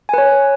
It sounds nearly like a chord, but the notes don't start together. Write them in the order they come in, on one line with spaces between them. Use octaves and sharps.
G#5 B4 C#5